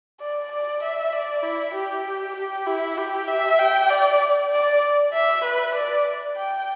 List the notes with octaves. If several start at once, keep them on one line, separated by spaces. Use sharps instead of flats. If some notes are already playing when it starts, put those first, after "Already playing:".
D5
D5
E5
D5
E4
G4
G4
E4
G4
E5
G5
D5
D5
E5
B4
D5
G5